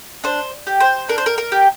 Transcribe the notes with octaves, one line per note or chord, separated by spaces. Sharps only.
D4 C5
G4
C5
D4 A#4
C5
A#4
A#4
G4